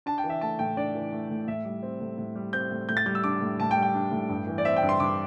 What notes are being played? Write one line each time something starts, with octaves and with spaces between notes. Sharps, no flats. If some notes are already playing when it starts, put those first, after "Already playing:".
D4 A5
G5
E3
E5
A3 A5
A2 G5
D4 D5
E3
A3
A2
A2 E5
G3
C4
A2
A2
G3
C4 G6
A2
A2 G6
A6
G3 G6
E6
D4 D6
A2
A2 A5
G5
G3
G5
D4
A2
G2
E3
D5
C4 E5
G5
G2
C6
G2 D6